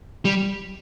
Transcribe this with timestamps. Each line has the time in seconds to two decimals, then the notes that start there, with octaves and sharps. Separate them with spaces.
0.25 G3